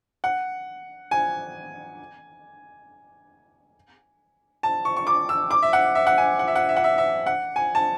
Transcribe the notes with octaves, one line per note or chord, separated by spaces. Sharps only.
F#5
G#5
A5
C#6
C#6
D6
E6
D6
E5
F#5
E5
F#5
G#5
F#5
E5
F#5
E5
F#5
E5
E5
F#5
G#5
A5